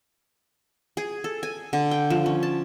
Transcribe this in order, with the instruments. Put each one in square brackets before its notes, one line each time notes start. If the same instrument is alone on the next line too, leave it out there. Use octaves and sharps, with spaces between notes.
[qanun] G#4
A4
G#5
D3
G5
F3
C#4
A5